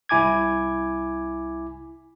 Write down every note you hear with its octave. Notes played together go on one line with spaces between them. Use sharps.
C2 E4 G#5 D6 G#6